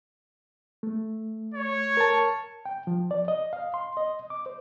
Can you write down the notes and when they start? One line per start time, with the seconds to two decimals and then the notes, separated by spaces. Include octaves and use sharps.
0.83 A3
1.54 C#5
1.97 A#4 A5
2.66 G5
2.87 F3
3.11 D5
3.28 D#5
3.53 F5
3.74 C6
3.97 D#5
4.30 D6
4.46 C5